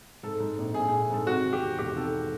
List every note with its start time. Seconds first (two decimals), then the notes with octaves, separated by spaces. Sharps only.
0.23 G#2 A4
0.40 G#2
0.58 A#1
0.74 A#1 G#4
0.89 A#1 G#4
1.10 G#2 A4
1.27 C3 F#4
1.45 D#3
1.53 G4
1.61 E2
1.79 E1 G4
1.96 D#3 A4